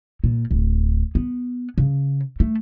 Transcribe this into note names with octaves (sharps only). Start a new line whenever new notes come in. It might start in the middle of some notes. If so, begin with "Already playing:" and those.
A#2
D1
B3
C#3
A3